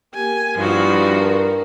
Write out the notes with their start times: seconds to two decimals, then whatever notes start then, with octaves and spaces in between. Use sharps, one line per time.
0.14 A#3 G4 G#5
0.58 G2 F3 D#4 E4 F#4
1.17 A#4 A#5